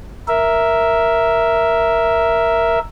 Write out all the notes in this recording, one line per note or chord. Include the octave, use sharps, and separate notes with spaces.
A#4 E5